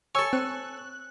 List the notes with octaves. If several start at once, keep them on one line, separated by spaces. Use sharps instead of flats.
A4 C#5 G#5 C#6 E6
C4 F#6